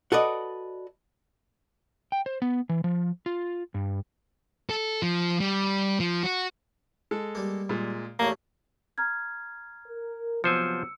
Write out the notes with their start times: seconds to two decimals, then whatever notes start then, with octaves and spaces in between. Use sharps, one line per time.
0.12 F#4 A4 B4 D5 D#5
2.12 G5
2.26 C5
2.42 B3
2.69 E3
2.84 F3
3.26 F4
3.74 G2
4.70 A4
5.02 F3
5.40 G3
6.00 F3
6.23 F#4
7.11 G#3 A4
7.35 G3 A#3
7.69 A#2 G#3
8.19 A1 E2 A3 A#3 C#4
8.98 A#5 F6 G#6
9.87 A#4
10.44 C3 F3 F#3 B3 C5 G#5 E6 C#7